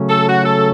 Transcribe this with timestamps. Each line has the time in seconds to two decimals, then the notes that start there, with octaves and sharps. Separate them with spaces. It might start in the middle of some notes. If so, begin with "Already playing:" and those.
Already playing: C#3 F#3 A3 C#4
0.09 A4
0.27 F#4
0.45 A4